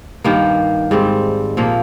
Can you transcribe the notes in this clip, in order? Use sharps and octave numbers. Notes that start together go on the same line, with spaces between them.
G2 D#3 A#3
G#2 G3 C4
A#2 F3 A#3